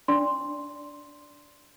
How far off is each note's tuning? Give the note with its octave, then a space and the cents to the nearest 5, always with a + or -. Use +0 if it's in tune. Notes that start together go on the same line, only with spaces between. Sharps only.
D4 -10 D5 -15 C6 +0